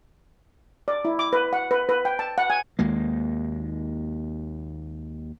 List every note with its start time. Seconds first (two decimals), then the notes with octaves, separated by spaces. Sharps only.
0.88 D5
1.05 E4
1.19 D6
1.33 B4
1.53 F#5
1.71 B4
1.89 B4
2.05 G5
2.19 A5
2.38 F#5
2.50 G#5
2.79 D#2 G#3 A#3